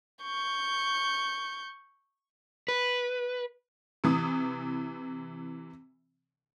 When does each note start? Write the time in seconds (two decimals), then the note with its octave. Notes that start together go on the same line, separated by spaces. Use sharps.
0.23 C#6 G6
2.68 B4
4.04 C3 E3 D#6